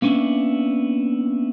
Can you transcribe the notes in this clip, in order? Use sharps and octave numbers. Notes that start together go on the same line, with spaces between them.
A#3 B3 C#4 D4 E4